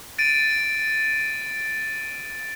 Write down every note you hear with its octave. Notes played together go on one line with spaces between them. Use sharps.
A6 D7 D#7